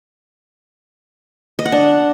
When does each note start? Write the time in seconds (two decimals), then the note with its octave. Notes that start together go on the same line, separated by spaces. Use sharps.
1.59 D#5
1.66 F#5
1.72 D4